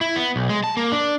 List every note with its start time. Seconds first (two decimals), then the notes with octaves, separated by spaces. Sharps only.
0.01 E4
0.16 B3
0.36 B1
0.49 G#3
0.64 A5
0.77 A#3
0.92 D4